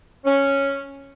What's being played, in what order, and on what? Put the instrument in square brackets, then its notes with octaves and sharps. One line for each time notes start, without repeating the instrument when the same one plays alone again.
[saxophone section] C#4